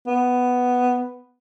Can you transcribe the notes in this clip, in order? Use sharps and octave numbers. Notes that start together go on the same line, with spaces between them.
B3